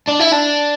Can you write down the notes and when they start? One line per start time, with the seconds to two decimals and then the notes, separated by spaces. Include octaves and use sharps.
0.09 D4
0.20 E4
0.33 D4